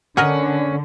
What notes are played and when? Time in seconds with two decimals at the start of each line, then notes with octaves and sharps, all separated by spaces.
0.17 D3 C#4 G#4 A#4 D#5 F#5